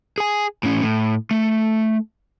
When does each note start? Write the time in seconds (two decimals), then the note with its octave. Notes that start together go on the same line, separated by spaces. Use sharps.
0.18 G#4 G#5
0.63 A2 C#4
0.83 A2
1.31 A3